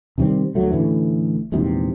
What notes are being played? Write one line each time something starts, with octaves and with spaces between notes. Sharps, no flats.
C3 D#3 G3 C4
D2 F#3 A3
A1 A2 D3 E3
A#1 E2 G#2 C3